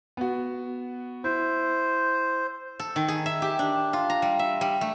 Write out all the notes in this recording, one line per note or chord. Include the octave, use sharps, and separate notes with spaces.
B3 F#4
E4 C5
A4
D#3
G#4
E5
G4
D4
F4
A#5
G3
E5
G3
A3